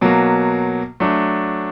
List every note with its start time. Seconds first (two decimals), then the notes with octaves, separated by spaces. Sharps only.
0.01 B2 F#3 A#3
1.00 F#3 A3 D4